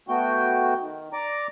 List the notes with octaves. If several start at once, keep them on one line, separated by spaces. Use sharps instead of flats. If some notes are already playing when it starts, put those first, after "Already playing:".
A3 B3 F#4 G5 G6
D#3
D5 A#5 D6